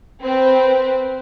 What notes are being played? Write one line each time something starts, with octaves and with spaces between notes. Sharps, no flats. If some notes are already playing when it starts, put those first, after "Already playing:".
C4 B4